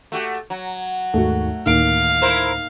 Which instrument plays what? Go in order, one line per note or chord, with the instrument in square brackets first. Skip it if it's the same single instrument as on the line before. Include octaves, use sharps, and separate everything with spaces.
[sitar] A3 F#4 G4
F#3
[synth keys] D#2 G#2 F#4 [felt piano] A3
[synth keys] D2 A2 [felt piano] D#3 A#3 D7 [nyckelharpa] F5
[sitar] E4 A#4 C5